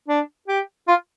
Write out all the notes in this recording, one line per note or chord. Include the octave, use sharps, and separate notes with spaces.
D4
G4
F4